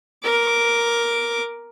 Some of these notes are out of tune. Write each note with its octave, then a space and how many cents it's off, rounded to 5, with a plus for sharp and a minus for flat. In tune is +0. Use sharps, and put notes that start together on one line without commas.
A#4 +5 D6 -5